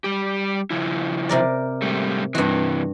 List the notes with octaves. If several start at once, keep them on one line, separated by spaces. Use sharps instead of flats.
G3 G4
C#3 F3 E4
C3 A#4 D5
G#2 G3 A3
G2 C3 E3 F#4